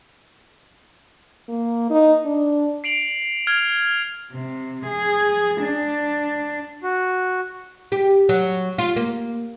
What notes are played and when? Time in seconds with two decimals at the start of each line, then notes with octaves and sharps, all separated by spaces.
1.49 A#3
1.90 D#4
2.25 D4
2.84 C7 D7 F7 F#7
3.47 F6 G#6 F7
4.32 C3
4.86 G#4
5.62 D4
6.83 F#4
7.92 G4
8.29 F#3
8.78 F4
8.96 A#3